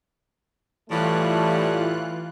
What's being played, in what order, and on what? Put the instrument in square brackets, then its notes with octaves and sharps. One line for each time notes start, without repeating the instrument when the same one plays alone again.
[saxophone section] A2 G3 [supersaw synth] E3 F4 F#6 [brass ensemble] A3